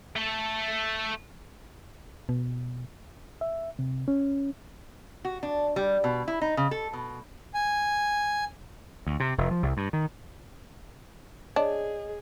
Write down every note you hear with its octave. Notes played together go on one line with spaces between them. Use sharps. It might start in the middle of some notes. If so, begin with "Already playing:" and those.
A3 A4
B2
E5
C3
C#4
F#4
D4
G3
B2
E4
D#4
C#3
A4
B2
G#5
D2
C3
F1
F3
C2
G2
D#3
D4 G#4 C#5 D#5